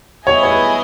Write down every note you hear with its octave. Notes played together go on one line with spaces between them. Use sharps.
B3 E4 G#4 C#5 D#5 G#5
C#5
B4